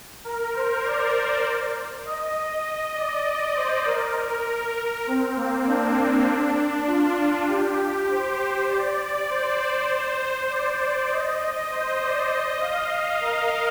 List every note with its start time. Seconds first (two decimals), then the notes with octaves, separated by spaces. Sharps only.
0.24 A#4
0.54 C5
0.84 D5
2.05 D#5
2.35 D#5
2.65 D#5
2.95 D5
3.25 D5
3.55 C5
3.85 A#4
5.07 C4
5.36 A#3
5.67 D4
5.97 C4
6.28 D4
6.87 F4
7.48 G4
8.09 C5
8.69 D5
9.29 C5
10.50 D5
11.11 D#5
11.71 C5
12.01 D5
12.31 D#5
12.61 F5
12.91 D#5
13.21 A#4